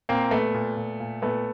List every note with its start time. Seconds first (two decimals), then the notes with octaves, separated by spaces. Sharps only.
0.09 A#2 A#3 C4
0.31 A#2 A3 B3
0.54 A#2
0.77 A#2
1.00 A#2
1.22 A#2 A3 B3